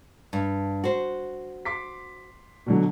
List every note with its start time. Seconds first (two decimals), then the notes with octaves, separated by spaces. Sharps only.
0.33 G2
0.84 F#4 C5
1.65 C6 D6 B6
2.66 B2 D3 F#3